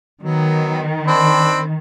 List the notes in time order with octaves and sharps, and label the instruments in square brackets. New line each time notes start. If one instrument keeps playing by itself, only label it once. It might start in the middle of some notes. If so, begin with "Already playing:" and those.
[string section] D#3 [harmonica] F#3 B3
[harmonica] C4 D4 B5